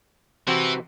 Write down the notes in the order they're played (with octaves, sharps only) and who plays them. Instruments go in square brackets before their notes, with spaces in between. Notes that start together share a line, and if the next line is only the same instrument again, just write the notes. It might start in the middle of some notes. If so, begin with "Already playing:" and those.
[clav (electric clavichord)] C3 C4 F#4 [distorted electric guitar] E3